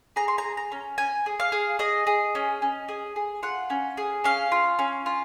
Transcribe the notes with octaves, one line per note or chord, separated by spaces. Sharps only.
G#4 A#5
C6
A#5
G#4
A#5
C#4
C#4 G#5
G#4
F5
G#4
G#4 D#5
G#4
C#4
C#4
G#4
G#4
F4 F#5
C#4
G#4
C#4 F5
F4
C#4
F4